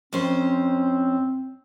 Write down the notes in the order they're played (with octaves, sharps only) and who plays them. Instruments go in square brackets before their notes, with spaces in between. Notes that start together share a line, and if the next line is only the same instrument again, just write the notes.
[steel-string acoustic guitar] F2 C#4 C5 [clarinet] C4